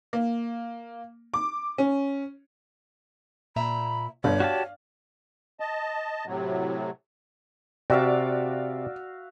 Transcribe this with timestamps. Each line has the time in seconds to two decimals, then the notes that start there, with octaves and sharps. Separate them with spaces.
0.13 A#3
1.34 D6
1.78 C#4
3.56 A#2 E5 A#5 B5
4.24 G1 C#5 D5
4.40 F#4 G4 F5 A5
5.60 D#5 A5
6.26 A2 C3 F#3
7.90 C3 F#4 D5 E5 F5